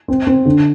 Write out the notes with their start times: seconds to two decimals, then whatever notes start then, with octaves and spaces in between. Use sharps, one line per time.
0.08 C4
0.27 C4
0.45 D3